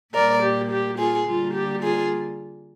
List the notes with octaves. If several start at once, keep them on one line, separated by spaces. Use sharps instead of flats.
A#2 G3 A#3 A#4 D5
G4
G4
F4 G#4
D3 G3 A#3 F4
G4
F4 G#4